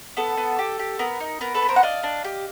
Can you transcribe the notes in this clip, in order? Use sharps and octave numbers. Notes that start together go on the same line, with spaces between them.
B3 A4
B3
G4
G4
B3 A#4
D#4
B3 A#4
A4 B4
B3
A#4 C5
F#5
D4 D#5 F5
D4
G4